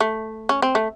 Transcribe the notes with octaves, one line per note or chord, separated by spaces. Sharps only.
A3
C#4
C4
A3